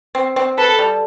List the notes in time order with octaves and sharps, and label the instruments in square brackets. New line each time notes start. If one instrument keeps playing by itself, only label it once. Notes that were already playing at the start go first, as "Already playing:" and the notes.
[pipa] C4
C4
[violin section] A4 [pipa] B4
[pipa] G3